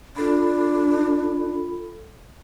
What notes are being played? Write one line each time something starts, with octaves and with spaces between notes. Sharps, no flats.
D4 F4 A4 B5